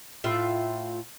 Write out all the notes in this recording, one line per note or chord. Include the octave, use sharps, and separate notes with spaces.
A2 F4 E5